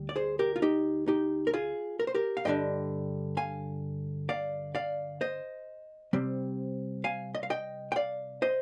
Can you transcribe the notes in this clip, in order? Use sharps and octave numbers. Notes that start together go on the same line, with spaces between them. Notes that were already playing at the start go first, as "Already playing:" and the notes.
Already playing: D2 G3
D5
G#4 C5
G4 A#4
F4
D#4 G4
D#4 G4
A#4
F4 G#4
A#4
C5
G4 A#4
F5
G2 D3 G3 D4 D#5 G5
F5 G#5
D5 F5
D5 F5
C5 D#5
C3 G3 C4
F5 G#5
D#5
F5
D#5 G5
G5
D5 F5
C5 D#5